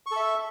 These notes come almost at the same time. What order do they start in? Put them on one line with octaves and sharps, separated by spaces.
C#6 A4 E5